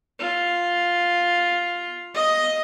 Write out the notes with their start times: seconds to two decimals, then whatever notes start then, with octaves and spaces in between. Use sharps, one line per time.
0.19 F4
2.14 D#5